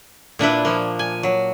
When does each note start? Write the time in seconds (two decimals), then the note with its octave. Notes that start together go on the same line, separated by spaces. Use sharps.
0.39 A#2 D4 E4 B4
0.65 F3 A#3
0.99 G#5
1.23 F#3